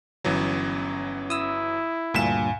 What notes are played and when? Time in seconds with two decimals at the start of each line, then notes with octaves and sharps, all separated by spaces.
0.24 G1 E3 F#3 C#4
1.30 E4 D#6 E6
2.14 D2 G2 A#2 F5 G#5 B6 E7